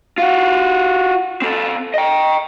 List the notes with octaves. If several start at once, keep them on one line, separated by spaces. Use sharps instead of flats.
F4 F#4
C4 A4
D#5 G5